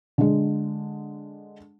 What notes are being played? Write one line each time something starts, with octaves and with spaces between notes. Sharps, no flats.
D3 G#3